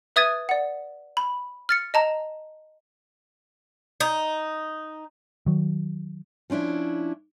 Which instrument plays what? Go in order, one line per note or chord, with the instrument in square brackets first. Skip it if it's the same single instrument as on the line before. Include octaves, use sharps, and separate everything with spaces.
[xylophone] B4 E5 D#6 G#6 A6 D#7
D5 F#5
B5
F6 A6 C#7
D#5 A5 A#5
[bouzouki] D#4
[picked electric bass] D#3 F#3
[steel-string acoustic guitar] F3 C#4 D4 E4